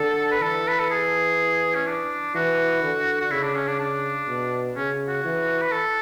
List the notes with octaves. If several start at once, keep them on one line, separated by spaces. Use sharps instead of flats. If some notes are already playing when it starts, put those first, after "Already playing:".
Already playing: D3 A4
B4
E3 A4
B4
A4
G#4
C#4
D4
E3 F#4
D3
F#4
C#3 E4
D4
C#4
D4
D4
B2
C#3 C#4
F#4
E3
B4
A4